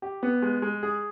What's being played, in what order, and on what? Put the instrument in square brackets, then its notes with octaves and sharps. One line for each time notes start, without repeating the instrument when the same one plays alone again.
[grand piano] G4
B3
G#3
G#3
G#4